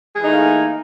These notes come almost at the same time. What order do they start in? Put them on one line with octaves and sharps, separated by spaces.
G#4 E3 D#4 A3 A#3